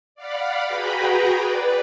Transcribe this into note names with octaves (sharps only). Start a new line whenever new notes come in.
D5 F5 F#5 B5
F#4 G#4 B4 G5 A#5 B5
B4 D5